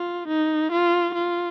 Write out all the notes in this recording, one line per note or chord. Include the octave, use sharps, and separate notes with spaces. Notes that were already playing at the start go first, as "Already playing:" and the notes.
Already playing: F4
D#4
F4
F4